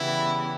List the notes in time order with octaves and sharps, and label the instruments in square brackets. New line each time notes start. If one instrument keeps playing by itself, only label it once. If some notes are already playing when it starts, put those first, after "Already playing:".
Already playing: [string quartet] C#3 E3 G3 B3 [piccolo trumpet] E4